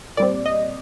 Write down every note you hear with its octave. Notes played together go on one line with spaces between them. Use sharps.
A#2 G3 C4 D5
D#5